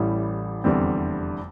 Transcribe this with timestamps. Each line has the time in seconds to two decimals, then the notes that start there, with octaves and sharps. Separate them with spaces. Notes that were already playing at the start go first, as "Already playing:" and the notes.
Already playing: A1 A2 E3 G3
0.64 F1 E2 D3 G3 C4